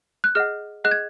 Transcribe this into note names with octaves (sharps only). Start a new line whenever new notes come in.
F#6
G#4 D#5 F#5 F6
G#4 D#5 F#5 F#6
G#6